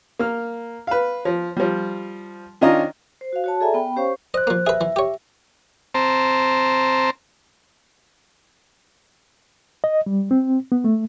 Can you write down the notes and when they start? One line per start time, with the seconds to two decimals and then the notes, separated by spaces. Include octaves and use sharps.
0.19 A#3 F6
0.87 B4 F5
1.25 F3
1.57 F3 G3
2.61 D#3 C#4 D4 F4 D#5 A#5
3.21 C5
3.33 F#4 F5
3.44 F#4 C#5 A5
3.61 G#4 A4 D5 E5 G#5 A#5
3.74 B3 G5 B5
3.96 C#4 G4 C5 C#5 F5 C#6
4.34 C5 D#5 F#6
4.47 F3 A#3
4.67 G#4 B4 E5
4.81 E3
4.96 G4 C#5
5.95 C4 C5 A5 A#5
9.84 D#5
10.06 G3
10.31 C4
10.72 B3
10.84 A3